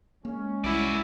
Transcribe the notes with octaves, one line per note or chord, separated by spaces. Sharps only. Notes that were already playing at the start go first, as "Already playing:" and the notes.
G#3 A#3 C#4
C2 E4 F#4 D5